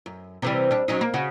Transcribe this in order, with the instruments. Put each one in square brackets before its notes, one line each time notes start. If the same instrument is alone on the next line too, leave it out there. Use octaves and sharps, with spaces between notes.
[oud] F#2
C3 E3 G3
G3 D4
F#3 C#4 D#4
A#3
C#3 F#4